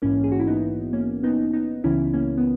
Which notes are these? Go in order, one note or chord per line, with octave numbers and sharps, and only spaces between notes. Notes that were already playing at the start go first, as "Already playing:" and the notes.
A#1 G#2 E3 A#3 C#4
G#4
F#4
E4
B3 D#4
A#3 C#4
B3 D#4
B3 D#4
C#2 C#3 E3 C#4 E4
A#3 C#4
B3